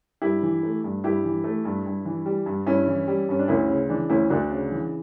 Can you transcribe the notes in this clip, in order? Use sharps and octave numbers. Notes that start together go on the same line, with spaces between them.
G2 E4 G4
E3
A3
G2
G2 E4 G4
E3
A3
G2
G2
E3
G3
G2
G2 C#4 E4
E3
G3
G2 C#4
D4
D2 C#4 E4
C#3
E3 D4
D2 C#4 E4
D2 D4 F#4
C#3
E3